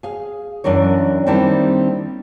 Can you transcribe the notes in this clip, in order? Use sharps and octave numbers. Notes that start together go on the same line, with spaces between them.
G#4 F5
F#2 E3 D4 A#4 C#5
D#3 G3 A#3 C4 D4 E4